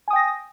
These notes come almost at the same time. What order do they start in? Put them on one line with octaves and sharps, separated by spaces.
G#5 D#6 G5 A#6